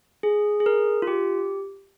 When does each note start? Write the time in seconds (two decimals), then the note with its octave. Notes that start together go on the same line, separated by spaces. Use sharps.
0.23 G#4
0.60 G#4
0.66 A#4
1.02 F4
1.07 G4